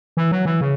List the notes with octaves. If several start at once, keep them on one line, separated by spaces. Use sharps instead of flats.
E3
F#3
E3
C#3